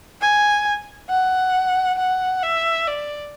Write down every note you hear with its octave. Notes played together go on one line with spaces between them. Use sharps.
G#5
F#5
F#5
E5
D5